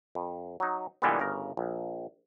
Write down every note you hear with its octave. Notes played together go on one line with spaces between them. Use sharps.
F2
F#3 D#4
A#2 D3 E3 G3 G#3 B3
G1 C#3 A#4
A#1